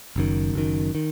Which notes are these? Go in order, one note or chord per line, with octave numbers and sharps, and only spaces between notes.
F#1 F#2 D#3
F#1 F#2 D#3
D#3